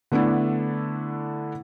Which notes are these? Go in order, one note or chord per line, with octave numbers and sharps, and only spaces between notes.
D3 A3 B3 D4 E4